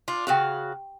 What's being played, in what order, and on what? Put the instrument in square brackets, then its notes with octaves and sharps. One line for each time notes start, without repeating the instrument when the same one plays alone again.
[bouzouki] D4 F4
[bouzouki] C#3 F#4 F5 [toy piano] G4 G5